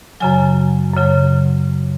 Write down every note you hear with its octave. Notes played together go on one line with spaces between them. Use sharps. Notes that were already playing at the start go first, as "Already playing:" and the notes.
F#2 C#3 F#3 G#5
F#2 C#3 F#3